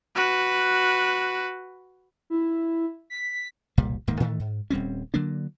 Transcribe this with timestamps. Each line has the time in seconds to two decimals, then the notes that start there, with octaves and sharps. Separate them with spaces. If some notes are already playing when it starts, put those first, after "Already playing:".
0.16 F#4 B4
2.30 E4
3.10 B6
3.77 E1 C2 A#2 G3
4.07 D1 G#2 D#3 A#3
4.20 A2 D#3 E3 A3
4.40 G#2
4.70 D#1 G3 C4 C#4
5.14 D3 F#3 A#3 D4